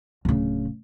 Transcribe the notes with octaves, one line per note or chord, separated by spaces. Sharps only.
D1 C#3